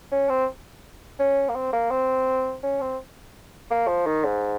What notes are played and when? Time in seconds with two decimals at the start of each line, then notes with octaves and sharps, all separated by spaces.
0.12 C#4
0.29 C4
1.19 C#4
1.49 A#3
1.55 C4
1.73 A#3
1.91 C4
2.63 C#4
2.81 C4
3.71 A#3
3.88 F3
4.06 D#3
4.25 G#2